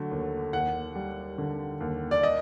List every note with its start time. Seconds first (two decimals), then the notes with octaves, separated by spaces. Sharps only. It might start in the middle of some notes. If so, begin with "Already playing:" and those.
Already playing: D3 F#3 A3
0.11 D#2
0.53 D#2 F#5
0.95 G3
1.38 D3
1.81 D#2
2.11 D5
2.23 D#5